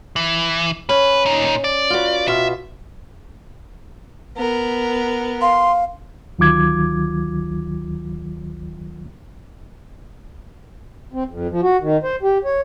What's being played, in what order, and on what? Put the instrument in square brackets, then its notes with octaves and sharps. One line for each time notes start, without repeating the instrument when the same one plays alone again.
[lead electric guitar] E3
[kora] C#4 [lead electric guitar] B4
[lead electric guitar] A#2 D#4
D5
[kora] F4 F#4 B4
[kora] B2 F4 [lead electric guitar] E5
[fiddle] B3 A#4
[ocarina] F5 [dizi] C6
[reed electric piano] D2 D#3 F#3 F4 D6 G#6
[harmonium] C4
F2
F3
F#4
D#3
C5
G4
C#5